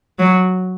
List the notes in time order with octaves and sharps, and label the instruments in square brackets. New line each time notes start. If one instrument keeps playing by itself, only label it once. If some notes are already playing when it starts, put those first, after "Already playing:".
[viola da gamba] F#3